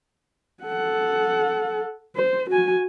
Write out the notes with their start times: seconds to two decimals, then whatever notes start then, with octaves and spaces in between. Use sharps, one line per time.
0.63 A4 F#5
2.16 C5
2.50 F#4 G#5